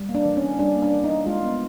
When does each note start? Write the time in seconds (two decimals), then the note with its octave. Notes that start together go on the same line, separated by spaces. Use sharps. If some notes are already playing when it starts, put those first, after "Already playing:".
Already playing: G3
0.09 A#3
0.15 D4
0.26 E3
0.37 C#4
0.43 E3
0.59 G3 D4
0.76 A#3
0.82 D4
0.94 E3
1.04 D#4
1.09 E3
1.26 G#3 F4
1.43 B3